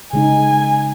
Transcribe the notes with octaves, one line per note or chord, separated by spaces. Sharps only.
C#3 G#3 D#4 G#5